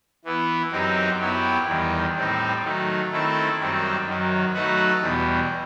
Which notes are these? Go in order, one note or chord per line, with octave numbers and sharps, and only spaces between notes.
E3 B3 E4
F#2 F#3 C4 D#4 G4
F#2 F#3 B3 E4 G4
E2 D#3 G3
A2 G3 C4 D#4
D#3 F#3 A3
D#3 A3 C4 E4 A4
F#2 D#3 G3 C4
F#2 D#3 F#3
F#3 A3 D#4 F#4 B4
E2 B2 G3